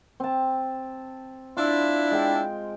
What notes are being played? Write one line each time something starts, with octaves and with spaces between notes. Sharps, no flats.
C4 A5
D4 E4 F4
G#3 G5